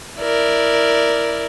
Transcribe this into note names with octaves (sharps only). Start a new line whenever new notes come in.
E4 A#4 D5